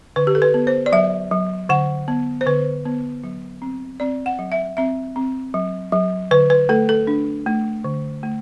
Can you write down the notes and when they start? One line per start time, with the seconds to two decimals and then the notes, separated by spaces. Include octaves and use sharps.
0.16 D3 B4
0.27 G4
0.35 A4
0.42 B4
0.54 B3
0.67 C5
0.86 D5
0.92 F#3 E5
1.31 F#3
1.69 D3 F#5
2.08 B3
2.41 C5
2.46 D3 B4
2.85 B3
3.24 F#3
3.62 C4
4.00 C4 D5
4.26 F#5
4.39 F#3
4.52 E5
4.77 C4 E5
5.16 C4
5.54 F#3
5.92 F#3
6.31 D3 B4
6.50 B4
6.69 A3 A4
6.89 A4
7.07 D4
7.47 A3
7.84 D3
8.23 A3